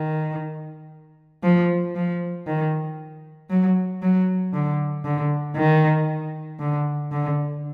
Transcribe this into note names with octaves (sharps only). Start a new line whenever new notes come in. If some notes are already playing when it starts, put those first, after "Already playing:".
Already playing: D#3
F3
F3
D#3
F#3
F#3
D3
D3
D#3
D3
D3